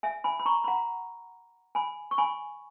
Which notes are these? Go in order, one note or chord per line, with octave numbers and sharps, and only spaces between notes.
E5 G#5
G#5 B5
B5
A#5 C#6
B5
F#5 A#5
G#5 B5
C#6
G#5 B5